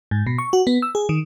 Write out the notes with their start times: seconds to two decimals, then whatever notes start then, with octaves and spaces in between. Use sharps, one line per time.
0.11 G#2
0.27 B2
0.38 C#6
0.53 F#4
0.67 B3
0.82 E6
0.95 G#4
1.09 D#3